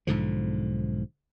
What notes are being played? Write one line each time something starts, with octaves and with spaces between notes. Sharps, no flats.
B1 G#2 D3 F3